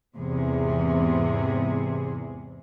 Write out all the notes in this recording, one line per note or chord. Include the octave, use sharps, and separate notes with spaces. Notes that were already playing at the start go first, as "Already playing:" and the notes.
E2 G#2 C3 G#4